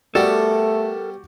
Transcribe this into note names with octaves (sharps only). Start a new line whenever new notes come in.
G3 A3 B3 F#4 G4 A4 A#4 D5